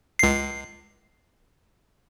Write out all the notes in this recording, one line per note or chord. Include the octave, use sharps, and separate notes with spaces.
C#2 C7